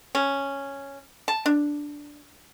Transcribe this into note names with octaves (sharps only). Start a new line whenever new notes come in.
C#4
A5
D4